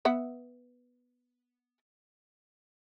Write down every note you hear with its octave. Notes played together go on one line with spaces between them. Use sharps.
B3 E5 F#5